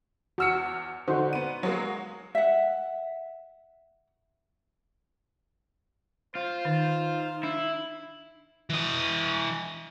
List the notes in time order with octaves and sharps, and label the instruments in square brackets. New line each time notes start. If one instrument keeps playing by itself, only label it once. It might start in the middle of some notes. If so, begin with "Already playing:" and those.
[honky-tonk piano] E2 F6 C#7 [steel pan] F#4 E6
[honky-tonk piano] D3 [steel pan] D#4 F#4 C5
[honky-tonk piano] B3 D#7
F#3 G#3 A#3
[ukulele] E5 F#5
[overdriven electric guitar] F4 [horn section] C5
[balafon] D#3 [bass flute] D#4
[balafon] D4 [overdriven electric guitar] E4
[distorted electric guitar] E3 D#5